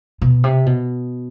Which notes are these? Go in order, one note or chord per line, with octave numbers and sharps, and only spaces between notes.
B2
C3
B2